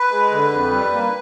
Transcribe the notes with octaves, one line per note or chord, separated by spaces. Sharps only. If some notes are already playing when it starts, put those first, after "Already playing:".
Already playing: B4
G#3
D3
F2
G3
A#3